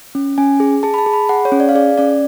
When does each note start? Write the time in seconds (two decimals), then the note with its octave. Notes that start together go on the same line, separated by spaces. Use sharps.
0.15 C#4
0.38 C#4 G#5
0.60 G#4
0.83 G#4 A5
0.94 B5
0.98 A5
1.06 G#4
1.13 B5
1.29 G#4 F#5
1.45 C#5
1.52 C#4
1.60 D5
1.69 F5
1.75 G#4 D5
1.98 C#4 D5